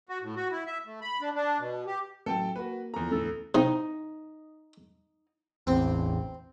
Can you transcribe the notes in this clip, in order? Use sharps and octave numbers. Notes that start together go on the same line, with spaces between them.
F#4
A2
F#4
E4
E5
A3
B5
D4
D4
B2
G4
A1 F#3 A4 G5 A5
A#3 F#4 B4
E2 F3 A4 A#5
D2 A2 E4 A4
C3 D#4
A1 E2 C4